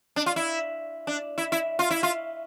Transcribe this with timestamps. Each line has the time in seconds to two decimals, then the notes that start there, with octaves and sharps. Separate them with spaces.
0.16 D4
0.26 F4
0.36 E4
1.07 D4
1.38 E4
1.52 E4
1.79 F4
1.91 E4
2.03 F4